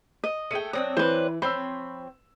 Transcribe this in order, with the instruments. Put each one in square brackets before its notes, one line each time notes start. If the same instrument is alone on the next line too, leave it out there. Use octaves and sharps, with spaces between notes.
[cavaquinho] D#5
[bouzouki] A3 G#4 G5 [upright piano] C#7 D#7
[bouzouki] F#3 C4 D4 [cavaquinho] D#6
[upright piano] E3 [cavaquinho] B4 C5
[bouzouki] F3 C4 C#5 [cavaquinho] C5 [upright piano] B5 E6